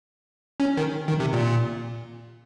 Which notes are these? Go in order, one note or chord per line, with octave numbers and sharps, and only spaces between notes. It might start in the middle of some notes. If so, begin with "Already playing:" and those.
C#4
D#3
D#3
C3
A#2